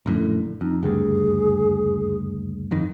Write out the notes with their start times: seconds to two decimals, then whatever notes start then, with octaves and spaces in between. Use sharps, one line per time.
0.06 A#1 F#2 A2 D3
0.61 F2 D#4
0.83 F#1 D2 G2 G#4
2.71 G1 F2 D#3